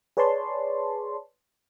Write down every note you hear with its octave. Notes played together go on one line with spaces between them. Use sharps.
G#4 B4 C#5 D5 A5 C6